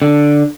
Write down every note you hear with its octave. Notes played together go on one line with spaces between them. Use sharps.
D3